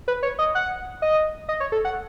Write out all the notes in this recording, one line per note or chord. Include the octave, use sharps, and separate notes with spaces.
B4
C#5
D#5
F#5
D#5
D#5
C#5
A4
F#5